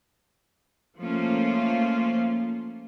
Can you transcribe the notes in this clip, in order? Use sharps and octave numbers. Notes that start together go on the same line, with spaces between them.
F3 A3 A#3 C#4 F4